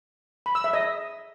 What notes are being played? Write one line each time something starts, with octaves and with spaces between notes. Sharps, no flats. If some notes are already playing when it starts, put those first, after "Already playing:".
B5
E6
E5
D#5